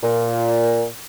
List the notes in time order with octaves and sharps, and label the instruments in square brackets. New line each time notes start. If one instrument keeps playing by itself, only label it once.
[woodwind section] A#2